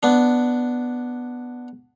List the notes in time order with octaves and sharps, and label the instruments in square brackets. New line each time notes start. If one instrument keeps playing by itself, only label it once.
[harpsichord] B3 D4